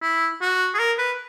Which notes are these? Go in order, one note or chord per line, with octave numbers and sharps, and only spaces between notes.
E4
F#4
G#4
A#4
B4